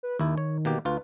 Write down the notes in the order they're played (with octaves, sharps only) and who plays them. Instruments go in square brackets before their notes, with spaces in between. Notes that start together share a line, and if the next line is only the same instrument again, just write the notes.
[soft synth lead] B4
[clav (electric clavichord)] D#2 E4 [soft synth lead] D#3
[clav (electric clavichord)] C#5
B2 A#3 G4
[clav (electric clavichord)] D2 F4 [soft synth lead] B4